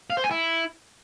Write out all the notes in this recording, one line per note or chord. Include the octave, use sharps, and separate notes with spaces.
F5
C5
G#5
E4